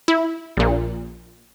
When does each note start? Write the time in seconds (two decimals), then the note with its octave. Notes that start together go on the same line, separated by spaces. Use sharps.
0.08 E4
0.57 A#1 A#2